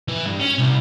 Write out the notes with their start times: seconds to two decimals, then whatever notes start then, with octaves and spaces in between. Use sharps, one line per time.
0.08 E3
0.25 G2
0.39 C#4
0.58 C2